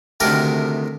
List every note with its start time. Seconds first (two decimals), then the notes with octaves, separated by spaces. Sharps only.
0.20 D2 C3 D#3 A3 G4 A#4